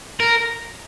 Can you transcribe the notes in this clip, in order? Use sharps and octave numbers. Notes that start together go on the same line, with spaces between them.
A#4